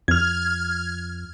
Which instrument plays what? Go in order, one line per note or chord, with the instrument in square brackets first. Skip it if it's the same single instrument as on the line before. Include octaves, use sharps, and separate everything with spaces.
[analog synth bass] F2 [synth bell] F6 G#6